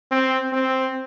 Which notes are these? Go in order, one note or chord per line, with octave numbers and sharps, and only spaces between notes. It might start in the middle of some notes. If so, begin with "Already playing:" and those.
C4
C4